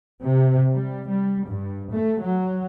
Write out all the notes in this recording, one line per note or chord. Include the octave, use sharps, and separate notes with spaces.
C3
G3
G3
G2
A3
F#3